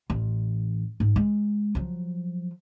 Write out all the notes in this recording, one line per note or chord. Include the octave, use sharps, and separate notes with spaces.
A1
G#2
G#3
F3 F#3